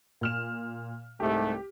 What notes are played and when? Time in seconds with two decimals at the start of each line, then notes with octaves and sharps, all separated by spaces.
0.21 A#2 F6 E7
1.20 C2 G#2 A3 G4